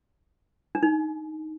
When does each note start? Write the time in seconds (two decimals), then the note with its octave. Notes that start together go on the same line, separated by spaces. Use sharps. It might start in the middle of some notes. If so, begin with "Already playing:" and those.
0.75 D4
0.83 D#4